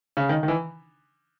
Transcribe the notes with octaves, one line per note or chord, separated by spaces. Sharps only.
C#3
D#3
D#3
E3